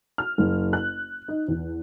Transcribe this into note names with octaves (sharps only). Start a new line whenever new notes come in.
F6
F#1
F#6
D#4
E2